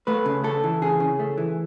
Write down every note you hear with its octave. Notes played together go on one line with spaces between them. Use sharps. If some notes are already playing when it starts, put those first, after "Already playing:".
A3 B4
C#3
A3 A4
E3
C#3 G#4
C#3
A3
E3